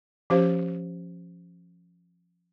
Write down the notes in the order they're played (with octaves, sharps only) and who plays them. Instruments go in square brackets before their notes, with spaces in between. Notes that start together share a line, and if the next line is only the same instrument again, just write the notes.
[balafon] F3 C#4 G4 C5 F5